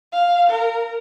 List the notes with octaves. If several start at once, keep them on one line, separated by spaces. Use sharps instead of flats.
F5
A#4